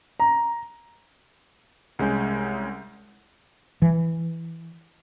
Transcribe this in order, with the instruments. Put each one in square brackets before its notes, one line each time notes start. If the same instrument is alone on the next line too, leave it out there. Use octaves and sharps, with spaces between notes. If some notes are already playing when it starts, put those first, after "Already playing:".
[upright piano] A#5
[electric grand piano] C2 G#3 C#4 G6
[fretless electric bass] E3